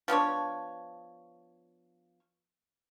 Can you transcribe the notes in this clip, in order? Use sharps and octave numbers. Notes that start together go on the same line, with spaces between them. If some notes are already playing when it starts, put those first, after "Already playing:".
F3 B3 D4 C#5